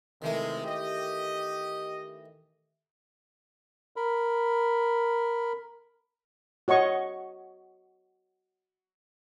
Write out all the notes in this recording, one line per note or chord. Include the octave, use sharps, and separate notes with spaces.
C3 D#3 E3 G#3 A3
G4 D#5
A#4 B5
F#4 C#5 D#5 C#6